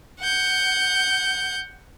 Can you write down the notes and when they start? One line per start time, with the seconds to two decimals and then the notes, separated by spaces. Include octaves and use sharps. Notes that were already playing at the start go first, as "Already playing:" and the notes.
0.21 F#5 G6